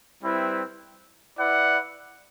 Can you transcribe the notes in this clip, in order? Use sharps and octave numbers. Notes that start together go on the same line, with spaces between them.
G3 C4 E4 B4
E4 B4 D5 F#5